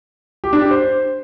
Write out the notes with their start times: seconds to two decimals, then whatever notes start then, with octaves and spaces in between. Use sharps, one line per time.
0.44 G4
0.53 D4
0.62 G4
0.71 C5